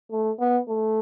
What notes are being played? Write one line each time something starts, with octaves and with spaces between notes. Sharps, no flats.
A3
B3
A3